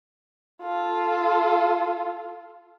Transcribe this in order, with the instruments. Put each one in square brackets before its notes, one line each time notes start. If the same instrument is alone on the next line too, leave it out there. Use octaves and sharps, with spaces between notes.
[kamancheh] F4 A4